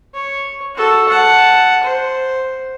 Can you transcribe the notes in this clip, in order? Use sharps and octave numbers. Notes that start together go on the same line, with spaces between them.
C#5
F#4 A4
F#5 A5
C5